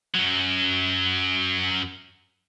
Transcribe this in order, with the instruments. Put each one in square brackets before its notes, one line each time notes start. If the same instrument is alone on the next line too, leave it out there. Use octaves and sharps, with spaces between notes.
[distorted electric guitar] F#2 F#3